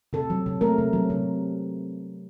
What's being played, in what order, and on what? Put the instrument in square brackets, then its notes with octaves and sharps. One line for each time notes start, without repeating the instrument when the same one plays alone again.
[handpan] C3 A4
F#3
C3
A3 A#4
C3
F#3
C3